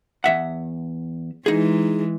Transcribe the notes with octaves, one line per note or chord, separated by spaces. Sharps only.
E2 E5 F#5
E3 G#3 D#4 G#4